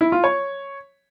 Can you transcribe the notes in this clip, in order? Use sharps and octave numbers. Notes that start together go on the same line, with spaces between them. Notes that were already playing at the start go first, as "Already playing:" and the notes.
E4
F4
C#5